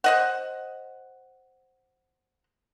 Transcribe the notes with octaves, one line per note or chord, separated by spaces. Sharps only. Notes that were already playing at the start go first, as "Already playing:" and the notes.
C5 D#5 F#5